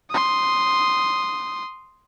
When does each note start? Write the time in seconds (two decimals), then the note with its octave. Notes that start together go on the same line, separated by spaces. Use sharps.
0.10 C6 D#6